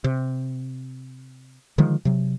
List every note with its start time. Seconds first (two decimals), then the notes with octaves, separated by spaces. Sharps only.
0.04 C3
1.78 D3 D#3 F3 G#3
2.05 C3 F#3